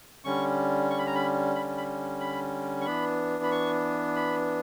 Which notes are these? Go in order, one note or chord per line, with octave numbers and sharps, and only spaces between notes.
D3 G3 C#4 C#6
C#6
B5
A#5
B5
B5
B5
B5
C#6
E3 B3 D4 B5
B5
C#6
B5